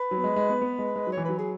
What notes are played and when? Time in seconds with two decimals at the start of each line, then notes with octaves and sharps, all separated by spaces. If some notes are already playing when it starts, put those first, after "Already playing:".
Already playing: B4
0.11 F#3
0.18 B3
0.24 G#3
0.36 G#3
0.49 B3
0.61 B3
0.79 G#3
0.96 G#3
1.07 F#3
1.12 C#5
1.17 E3
1.25 F#3 B4
1.38 G#4